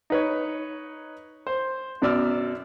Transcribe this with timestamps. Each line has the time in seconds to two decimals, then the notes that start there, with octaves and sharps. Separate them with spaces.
0.10 D#4 B4 C#5
1.47 C5
2.02 F#2 B2 D5 E6 F6